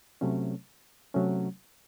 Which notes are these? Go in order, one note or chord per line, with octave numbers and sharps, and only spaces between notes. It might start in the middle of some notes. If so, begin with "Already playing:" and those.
C3 F#3 A3 C#4
C3 F#3 A3 C#4